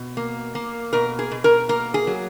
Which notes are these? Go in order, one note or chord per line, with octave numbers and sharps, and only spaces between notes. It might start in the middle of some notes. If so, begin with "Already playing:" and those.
Already playing: B2
A#3
A#3
B2 A#4
G#4
B2
A#4
A#3 A#4
G#4
F#3